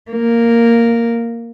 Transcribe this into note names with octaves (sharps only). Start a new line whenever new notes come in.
A#3